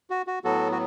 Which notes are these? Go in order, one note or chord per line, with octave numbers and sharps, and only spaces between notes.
F#4
F#4
A2 F#3 B3 F#4 A4
F#4